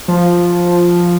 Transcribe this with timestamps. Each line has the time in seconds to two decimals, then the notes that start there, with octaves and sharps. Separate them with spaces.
0.08 F3